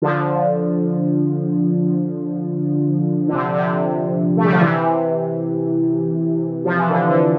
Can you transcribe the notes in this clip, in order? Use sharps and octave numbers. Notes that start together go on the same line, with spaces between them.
D3 F3
D3
C3
C3
D3
A3
G3
F3
C3 E3
F3
E3
D3
D3